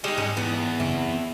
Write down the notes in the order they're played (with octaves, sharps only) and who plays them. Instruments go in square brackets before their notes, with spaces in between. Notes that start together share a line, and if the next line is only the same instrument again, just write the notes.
[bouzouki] G3 D#4 [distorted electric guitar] G#3
[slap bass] G#2 [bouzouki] C#4
[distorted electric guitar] E2 [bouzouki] B3
[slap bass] F#2 C#3 C4 [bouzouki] E4
[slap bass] C4